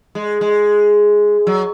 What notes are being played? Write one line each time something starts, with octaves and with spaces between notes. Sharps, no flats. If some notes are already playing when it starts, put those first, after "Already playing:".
G#3
G#3
F#3